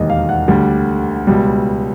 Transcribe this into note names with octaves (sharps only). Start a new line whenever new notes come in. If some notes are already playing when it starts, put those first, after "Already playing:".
Already playing: E1 D#2 D#3 G3 D#5
F5
F#5
D2 D3 G3
C#2 B2 G3